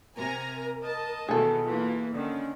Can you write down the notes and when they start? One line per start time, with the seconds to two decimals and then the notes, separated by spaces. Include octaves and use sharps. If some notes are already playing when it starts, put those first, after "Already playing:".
0.17 C3 A#4 G#5 A#5
0.82 D#5 A5
1.28 B2 D#3 E3 G#4 A4
1.64 E3 A#3 F4
2.15 D3 D#3 C#4